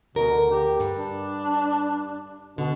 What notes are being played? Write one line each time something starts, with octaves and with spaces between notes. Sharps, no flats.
D2 B2 A#4
D3
G4
G2
D4
B2 D3